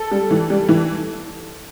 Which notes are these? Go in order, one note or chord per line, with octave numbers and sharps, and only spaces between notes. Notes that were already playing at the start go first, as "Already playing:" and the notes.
Already playing: A4
G3
E3
G3
E3